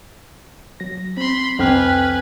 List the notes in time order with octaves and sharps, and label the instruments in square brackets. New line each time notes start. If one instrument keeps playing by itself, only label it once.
[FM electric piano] F#3 A#6
[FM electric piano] C4 [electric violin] B5 C6
[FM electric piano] C2 G5 F6 [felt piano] F2 [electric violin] B4 G#5